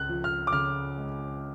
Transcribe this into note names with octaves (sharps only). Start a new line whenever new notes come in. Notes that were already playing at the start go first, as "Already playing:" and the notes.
Already playing: C#2 F#6
F3
F6
D6
C#3 F6
G#3